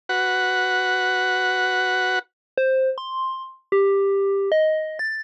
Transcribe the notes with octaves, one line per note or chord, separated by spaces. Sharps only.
F#4 B4 F#5
C5
C6
G4
D#5
A6